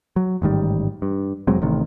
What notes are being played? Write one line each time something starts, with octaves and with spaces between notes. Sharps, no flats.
F#3
A1 G#2 D#3 G3
G2
F1 F#3 G#3 C4
A1 A2 C3 D#3